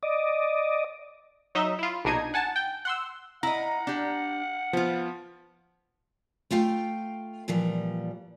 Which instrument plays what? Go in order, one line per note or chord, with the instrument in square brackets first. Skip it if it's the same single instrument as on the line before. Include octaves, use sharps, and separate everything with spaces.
[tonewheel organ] D5 D#5
[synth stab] F#3 D#4 D#5 E5
E4 F4
A#1 B2 D4 D#4 D#6 G#6
F#5 G#5 A5
G5
F#5 C6 E6
[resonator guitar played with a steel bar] E4 D#5 [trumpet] F#5 [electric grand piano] A#5
[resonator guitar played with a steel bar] D4 G4
[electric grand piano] F3 [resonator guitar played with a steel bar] B3 F4
[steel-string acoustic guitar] A3 F4 F5 G5
A#2 E3 F3 G3